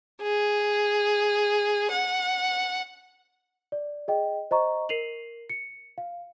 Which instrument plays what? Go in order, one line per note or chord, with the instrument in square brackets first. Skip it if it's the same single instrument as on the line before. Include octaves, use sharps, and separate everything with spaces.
[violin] G#4
F#5
[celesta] D5
G#4 D#5 G5
C5 D#5 A#5 C#6
A#4 C7 D#7 F7 F#7
C#7
F5